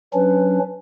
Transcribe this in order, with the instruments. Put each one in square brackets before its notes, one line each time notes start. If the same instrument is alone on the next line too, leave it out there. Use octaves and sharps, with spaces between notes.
[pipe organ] F#3 C#4 D4 [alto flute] B4